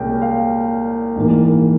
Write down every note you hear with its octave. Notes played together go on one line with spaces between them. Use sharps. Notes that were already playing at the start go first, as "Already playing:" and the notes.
Already playing: C2 A#2 G#3 C#4 G5
F5
A#1 G#2 E3 A#3